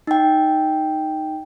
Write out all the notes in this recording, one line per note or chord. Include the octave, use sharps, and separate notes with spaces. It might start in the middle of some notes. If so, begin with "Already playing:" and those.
D#4 G5